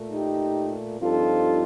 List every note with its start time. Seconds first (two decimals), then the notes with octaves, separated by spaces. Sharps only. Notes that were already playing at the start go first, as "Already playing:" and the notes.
Already playing: A#2 A3
0.11 D#4 G4
1.01 G2 F3 C4 D#4 F4 A4